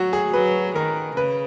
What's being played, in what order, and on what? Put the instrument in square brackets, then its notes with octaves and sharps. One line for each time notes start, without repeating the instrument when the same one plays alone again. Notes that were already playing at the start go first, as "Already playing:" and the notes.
Already playing: [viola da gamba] F#3 [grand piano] F#4
[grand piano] G#4
[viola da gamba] F#3 [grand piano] B4
[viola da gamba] D#3 [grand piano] A#4
[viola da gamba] C#3 [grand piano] B4